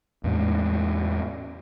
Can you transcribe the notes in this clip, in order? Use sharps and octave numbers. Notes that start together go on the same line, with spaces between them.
E2 A2 G#3